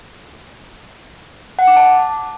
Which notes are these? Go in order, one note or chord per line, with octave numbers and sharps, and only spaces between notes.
F#5
D6
A5